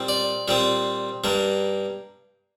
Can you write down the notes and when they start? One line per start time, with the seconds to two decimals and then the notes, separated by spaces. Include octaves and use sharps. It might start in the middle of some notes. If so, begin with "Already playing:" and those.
Already playing: A#2 G3 C4
0.08 D5
0.48 A#2 G3 C4
1.24 G2 G3 A#3